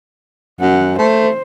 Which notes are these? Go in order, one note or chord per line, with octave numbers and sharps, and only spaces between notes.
F#2 F#5
A3 C5